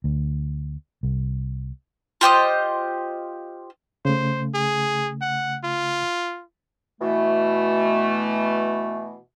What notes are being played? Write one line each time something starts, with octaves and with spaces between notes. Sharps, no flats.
D2
C2
F4 G4 C5 D#5
C#3 A3 C5
G#4
F#5
F4
B2 E3 A3